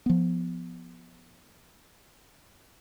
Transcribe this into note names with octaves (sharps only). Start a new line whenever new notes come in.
F3 B3